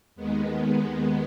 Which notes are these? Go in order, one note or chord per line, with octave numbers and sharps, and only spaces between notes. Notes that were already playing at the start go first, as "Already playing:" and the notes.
D#2 D#3 G#3 B3